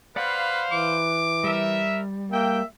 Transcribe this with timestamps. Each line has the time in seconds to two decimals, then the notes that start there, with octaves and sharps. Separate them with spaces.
0.16 B4 C5 D5 F5 F#5 B5
0.72 E3 D6
1.44 G3 A#4 E5
2.32 A#3 E5 G5